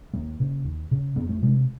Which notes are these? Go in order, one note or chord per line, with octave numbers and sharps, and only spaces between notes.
D#2 A#3
C#3
D#2
C#3
F2 B3
A3
C3 G#3